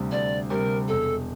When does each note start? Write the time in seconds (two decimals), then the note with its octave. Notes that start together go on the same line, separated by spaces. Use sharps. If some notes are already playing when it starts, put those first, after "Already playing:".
Already playing: D2 C3 G3
0.12 D2 D5
0.50 C3 G3 A#4
0.88 E1 A4